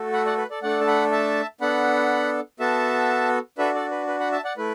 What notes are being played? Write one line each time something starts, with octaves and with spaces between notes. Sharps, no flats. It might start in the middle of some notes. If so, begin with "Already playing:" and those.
Already playing: A3 F#4 A4
F#5 B5
D5 F#5
B4
A4 D5
A3 D4 A4 D5 F#5
A5
F#5 B5
E5 A5
B3 D4 A4 F#5 B5
B3 F#4 A4 E5 A5
D4 F#4 A4 B4 E5
A4 D5
B4
B4
F#5 B5
E5 A5
D5 F#5
A3 E4 B4